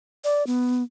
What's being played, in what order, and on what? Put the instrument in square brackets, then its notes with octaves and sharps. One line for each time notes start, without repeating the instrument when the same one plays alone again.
[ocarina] D5
B3